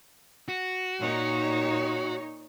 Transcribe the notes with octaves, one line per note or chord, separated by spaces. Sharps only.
F#4
A#2 D#4 C#5